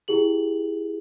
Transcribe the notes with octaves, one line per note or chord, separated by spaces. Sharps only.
E4 G4 G#4 F#7